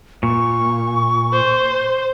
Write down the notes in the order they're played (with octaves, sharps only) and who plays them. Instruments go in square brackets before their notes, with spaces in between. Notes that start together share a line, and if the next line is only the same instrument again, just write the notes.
[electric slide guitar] A#2 [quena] C#6
[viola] C5